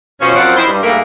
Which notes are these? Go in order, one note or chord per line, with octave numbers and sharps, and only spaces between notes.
F#2 B2 F3 C#4
F#2 F3 C4 D5 F5 F#5
E4 C5 D#5
G2
G#2 G3 A3 A#3